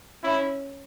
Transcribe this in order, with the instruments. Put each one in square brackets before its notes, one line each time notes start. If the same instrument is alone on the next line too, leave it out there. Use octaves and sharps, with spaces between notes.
[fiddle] C#4 [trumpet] E4